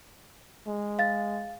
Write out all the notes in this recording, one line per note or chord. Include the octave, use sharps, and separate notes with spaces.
G#3
F5 A6